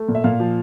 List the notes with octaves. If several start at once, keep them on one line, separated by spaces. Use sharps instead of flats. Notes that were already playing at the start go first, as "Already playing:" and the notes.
Already playing: A3
A#2
E5
A#2 F5
F3